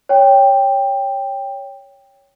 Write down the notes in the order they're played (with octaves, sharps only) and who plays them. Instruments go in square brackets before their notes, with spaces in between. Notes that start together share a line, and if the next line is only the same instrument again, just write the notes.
[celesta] C#5 G5